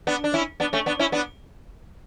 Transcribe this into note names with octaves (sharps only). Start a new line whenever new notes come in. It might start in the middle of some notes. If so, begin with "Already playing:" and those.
B3 D4
D4
C#4 E4
B3 D4
A3 C#4
B3 D4
C#4 E4
B3 D4